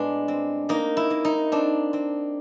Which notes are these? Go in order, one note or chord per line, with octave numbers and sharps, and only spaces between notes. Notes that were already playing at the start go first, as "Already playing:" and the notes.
Already playing: A2 G#3 B3 D4
C4
A#3 D#4
E4
A#3
D#4
C4 D4
C4